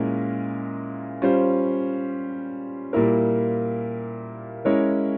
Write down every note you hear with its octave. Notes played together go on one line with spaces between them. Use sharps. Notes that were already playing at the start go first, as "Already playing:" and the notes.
Already playing: A#2 G#3 C#4 E4 A#4
G3 C#4 F4 C5
A#2 G3 A#3 E4 A#4
G#3 C#4 E4 A#4 C#5